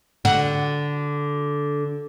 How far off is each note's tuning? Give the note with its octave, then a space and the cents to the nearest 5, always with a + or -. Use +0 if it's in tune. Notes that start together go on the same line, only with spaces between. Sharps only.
D3 -10 F#4 +0